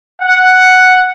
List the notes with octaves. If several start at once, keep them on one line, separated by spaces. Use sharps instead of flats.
F#5